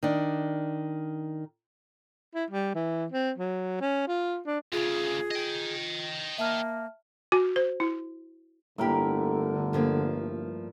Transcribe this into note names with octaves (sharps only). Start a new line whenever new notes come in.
D#3 D4
E4
G3
E3
C4
F#3
C#4
F4
D4
D2 C#3 F4 G#4
D#5 G5
A#3 E5 A5 F6
F#4
C5
E4
G1 A2 D3 A#3 G4 A#4 B5
G2 F3 A#3